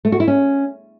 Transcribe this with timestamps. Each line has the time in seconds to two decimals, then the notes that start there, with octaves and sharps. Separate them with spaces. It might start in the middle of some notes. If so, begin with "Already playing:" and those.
0.05 A3
0.12 F#4
0.20 E4
0.27 C#4